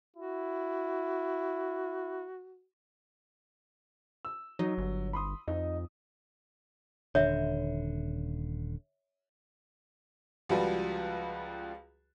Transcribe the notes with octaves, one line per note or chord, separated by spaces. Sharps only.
E4 F#4
E6
F#3 D#4
G1
B5 C6 D#6
F2 D#4
D#1 G#1 D3 C#5 E5
C#2 F3 G3 F#4 B4